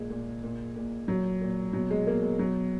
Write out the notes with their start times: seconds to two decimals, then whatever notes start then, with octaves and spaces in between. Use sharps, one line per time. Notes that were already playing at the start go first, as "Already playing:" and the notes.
Already playing: A#2 G#3
0.10 A#2
0.44 A#2
0.76 A#2
1.08 A#2 F#3
1.41 A#2
1.73 B2 F#3
1.91 G#3
2.07 B2 A#3
2.22 G#3
2.39 B2 F#3